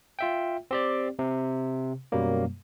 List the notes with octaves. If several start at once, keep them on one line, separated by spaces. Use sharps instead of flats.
F4 E5 G5
C4 G4 D5
C3
F#2 B2 F#3 G3 A#3